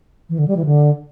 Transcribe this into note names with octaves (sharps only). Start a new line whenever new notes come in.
E3
D3
G3
E3
D3